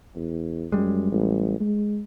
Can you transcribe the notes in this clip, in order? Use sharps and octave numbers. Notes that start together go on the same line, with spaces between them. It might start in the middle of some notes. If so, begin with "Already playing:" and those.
E2
F#2 G3 G#3
A1
G#3